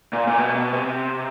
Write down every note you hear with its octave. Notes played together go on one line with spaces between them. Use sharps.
A#2
A#2
B2
B2
C3